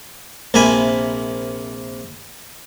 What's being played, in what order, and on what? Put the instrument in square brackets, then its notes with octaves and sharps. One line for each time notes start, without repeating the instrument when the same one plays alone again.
[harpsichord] A#1 C3 A#3 E5 G#5 B5